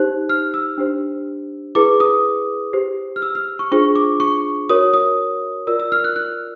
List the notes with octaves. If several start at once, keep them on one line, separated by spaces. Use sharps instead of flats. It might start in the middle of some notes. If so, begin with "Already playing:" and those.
Already playing: D#4 G4 C5 F#6
F6
E6
D4 G4 C5
E4 G#4 B4 D6
D#6
G4 C5
F6
E6
F6
C#6
D4 F4 G#4 C5 C#6
D6
C#6
F#4 A#4 C#5 D#6
D#6
F4 A#4 D5 E6
E6
F6
F#6
F#6